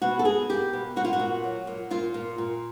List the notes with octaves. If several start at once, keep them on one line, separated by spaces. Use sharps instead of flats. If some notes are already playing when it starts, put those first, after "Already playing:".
B2 F#4
A4
B2 G#4
A#3 G4
B2
A#2 F#4
F4
F#4
A#2
F#3
A#2
A#2 F4
A#2
A#2